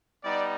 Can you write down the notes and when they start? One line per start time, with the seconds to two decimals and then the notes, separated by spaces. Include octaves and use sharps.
0.23 G3 B3 D#4 D5